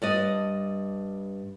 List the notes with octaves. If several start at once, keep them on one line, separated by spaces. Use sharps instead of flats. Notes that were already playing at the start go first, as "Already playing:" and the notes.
G2 D5 D#5